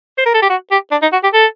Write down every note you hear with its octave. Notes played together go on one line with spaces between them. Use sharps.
C5
A#4
A4
G4
F#4
G4
D4
D#4
F#4
G4
A4